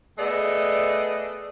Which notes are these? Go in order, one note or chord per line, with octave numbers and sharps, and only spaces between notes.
A3 B3 G#4 A4 D5 D#5